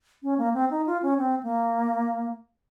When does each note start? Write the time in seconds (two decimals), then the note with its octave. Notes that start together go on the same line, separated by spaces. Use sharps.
0.23 C#4
0.38 A#3
0.54 C4
0.71 D#4
0.87 F4
1.03 C#4
1.18 C4
1.43 A#3